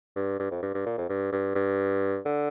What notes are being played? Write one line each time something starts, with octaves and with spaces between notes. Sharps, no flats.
G2
G2
F2
G2
G2
A#2
F2
G2
G2
G2
D3